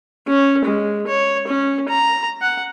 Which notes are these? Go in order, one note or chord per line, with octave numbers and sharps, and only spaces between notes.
C#4
G#3
C#5
C#4
A#5
F#5